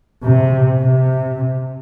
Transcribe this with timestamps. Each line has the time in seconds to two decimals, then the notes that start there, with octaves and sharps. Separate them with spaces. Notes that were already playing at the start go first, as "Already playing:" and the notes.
0.23 C3
0.80 C3